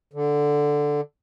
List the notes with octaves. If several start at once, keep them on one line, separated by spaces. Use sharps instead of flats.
D3